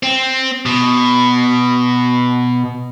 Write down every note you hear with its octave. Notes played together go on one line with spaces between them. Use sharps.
C4
B2